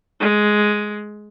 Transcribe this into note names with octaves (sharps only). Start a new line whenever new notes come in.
G#3